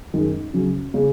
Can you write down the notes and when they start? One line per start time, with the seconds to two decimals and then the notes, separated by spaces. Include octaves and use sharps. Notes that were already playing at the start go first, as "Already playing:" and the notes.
0.13 F#2 D#3 G#3 D#4 G#4
0.54 C#3 F#3 C#4
0.94 C#3 G#3 C#4